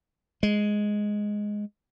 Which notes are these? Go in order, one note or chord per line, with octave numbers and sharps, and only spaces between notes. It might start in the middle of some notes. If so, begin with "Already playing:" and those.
G#3